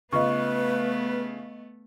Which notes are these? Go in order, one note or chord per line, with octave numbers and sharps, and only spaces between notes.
C#3 A3 B3 F4 B4 D#5 C#6